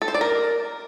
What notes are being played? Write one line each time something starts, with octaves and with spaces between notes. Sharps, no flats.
A4
C5
D5
A#4